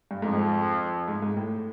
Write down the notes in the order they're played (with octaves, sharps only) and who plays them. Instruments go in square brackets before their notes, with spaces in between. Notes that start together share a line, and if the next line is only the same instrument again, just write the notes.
[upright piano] G2
[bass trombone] F2 [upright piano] G#2
[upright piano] G#2
G#2
A2